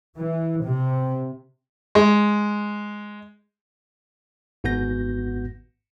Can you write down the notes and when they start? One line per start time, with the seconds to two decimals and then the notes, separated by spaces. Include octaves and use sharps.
0.16 E3
0.63 C3
1.95 G#3
4.64 G#1 G#2 B3 F#4 G6 A#6